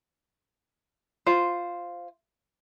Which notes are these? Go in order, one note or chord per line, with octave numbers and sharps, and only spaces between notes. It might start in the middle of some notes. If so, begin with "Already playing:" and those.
F4 C5